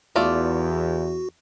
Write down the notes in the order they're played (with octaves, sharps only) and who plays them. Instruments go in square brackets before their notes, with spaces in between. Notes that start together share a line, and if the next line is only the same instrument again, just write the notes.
[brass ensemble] E2 [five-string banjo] A3 F4 D5 [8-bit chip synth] F#4